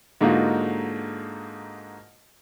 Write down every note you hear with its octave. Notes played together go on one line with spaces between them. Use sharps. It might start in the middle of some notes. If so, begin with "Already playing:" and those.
G#2 D3 A#3 D#4 F4 F#4